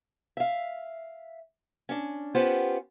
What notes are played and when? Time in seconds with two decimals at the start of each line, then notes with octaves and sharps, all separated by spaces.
0.37 E5 F5
1.89 C#4 D4
2.35 B3 C#4 F4 G4 C5 F#5